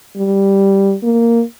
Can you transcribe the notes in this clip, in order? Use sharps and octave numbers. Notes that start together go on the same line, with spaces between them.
G3
A#3